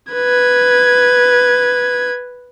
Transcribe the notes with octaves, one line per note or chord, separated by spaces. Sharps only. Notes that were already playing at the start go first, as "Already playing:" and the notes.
B4 G#6